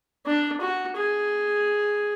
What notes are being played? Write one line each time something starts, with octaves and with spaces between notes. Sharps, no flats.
D4
F#4
G#4